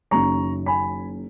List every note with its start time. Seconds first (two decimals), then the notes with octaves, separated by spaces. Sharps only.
0.11 F#1 F#2 D#3 A#5 C#6
0.66 G#5 B5